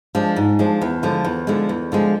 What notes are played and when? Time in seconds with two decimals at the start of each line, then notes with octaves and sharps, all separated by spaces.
0.15 F3 G#3 D4
0.36 G#2
0.59 F3 G#3 D4
0.82 E2
1.03 D3 F3 G#3
1.25 E2
1.47 D3 F3 G#3
1.69 E2
1.92 D3 F3 G#3